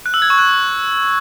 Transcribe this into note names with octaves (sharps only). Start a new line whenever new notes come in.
F#6
E6
G#6
C#6
F#6